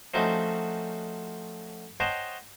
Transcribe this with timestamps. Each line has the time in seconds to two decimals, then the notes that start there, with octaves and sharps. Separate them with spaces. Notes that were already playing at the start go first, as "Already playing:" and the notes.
0.14 F3 F#3 A3 C4 C#4 D#4
2.00 C5 C#5 D#5 F#5 G5 A5